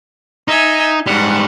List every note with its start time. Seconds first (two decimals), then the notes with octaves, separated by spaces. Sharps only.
0.48 D#4 E5 G#5
1.07 G#2 G3 F#5